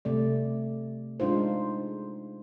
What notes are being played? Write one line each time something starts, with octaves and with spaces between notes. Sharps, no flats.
C3 A3 D5
G#3 D4 D#4 F4 C5